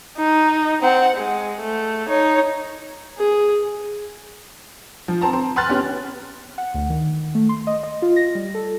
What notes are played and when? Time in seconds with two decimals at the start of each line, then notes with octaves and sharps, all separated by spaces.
0.17 D#4
0.82 C4 F#5
1.16 G#3
1.61 A3
2.07 D#4 C#5
3.18 G#4
5.08 F3
5.21 C4 A5 A#5
5.33 C4
5.56 G#5 B5 C6 F6 F#6 A6
5.69 B3 C#4 G4
6.58 F#5
6.74 D2
6.90 D#3
7.35 A3
7.49 C6
7.67 D#5
7.83 D#5
8.02 F4
8.16 A#6
8.35 G3
8.55 A4